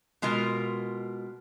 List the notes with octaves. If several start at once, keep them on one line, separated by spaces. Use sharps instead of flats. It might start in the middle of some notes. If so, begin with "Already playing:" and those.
B2 G#3 F4 A#4